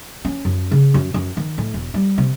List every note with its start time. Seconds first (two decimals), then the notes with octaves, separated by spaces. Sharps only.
0.25 C#4
0.45 F#2
0.71 C#3
0.94 F#2
1.14 F#2
1.37 D#3
1.58 A2
1.74 E1
1.94 G3
2.18 C3